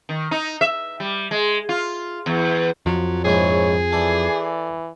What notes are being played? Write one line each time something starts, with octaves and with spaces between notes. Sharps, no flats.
D#3
D#4
E5
G3
G#3
F4
E2
F2 F3 F#3
A#1 G#2 E4 G#4 C#5
E3 A4 D5